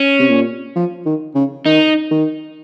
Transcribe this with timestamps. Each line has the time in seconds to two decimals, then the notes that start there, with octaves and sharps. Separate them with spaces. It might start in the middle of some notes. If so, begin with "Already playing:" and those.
Already playing: C#4
0.19 C3
0.30 A#2
0.76 F3
1.06 D#3
1.35 C#3
1.66 D#3 D#4
2.11 D#3